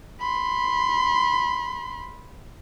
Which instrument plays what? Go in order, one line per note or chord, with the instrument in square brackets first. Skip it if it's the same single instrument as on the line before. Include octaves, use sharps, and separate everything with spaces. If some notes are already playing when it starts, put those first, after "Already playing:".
[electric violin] B5 C6